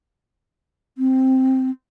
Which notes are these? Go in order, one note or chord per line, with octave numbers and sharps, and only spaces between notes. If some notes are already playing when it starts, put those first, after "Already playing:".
C4